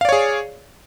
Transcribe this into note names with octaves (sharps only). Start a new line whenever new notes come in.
G#4 C#5 D5 F5